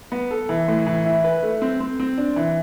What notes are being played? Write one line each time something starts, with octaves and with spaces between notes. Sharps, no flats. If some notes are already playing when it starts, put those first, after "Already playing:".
B3
A4
E3
A2
E3
E4
B4
A3
C4
C4
C4
D4
E3